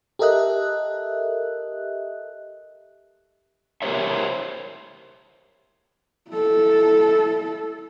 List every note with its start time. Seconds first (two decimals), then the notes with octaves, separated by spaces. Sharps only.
0.19 G4 A4 A#4 D#5 E5 F#6
3.82 G4 A#4 C5 C#5 E5
6.31 E4 A4